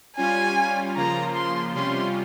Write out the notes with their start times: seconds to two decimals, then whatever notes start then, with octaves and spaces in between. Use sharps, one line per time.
0.17 G3 C#4 F4 G#5
0.96 C#3 F3 A#3 F4 A#5
1.36 C6
1.74 C3 G3 C#4 F4 C6